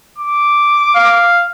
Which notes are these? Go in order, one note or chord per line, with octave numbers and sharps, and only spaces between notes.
D6
F5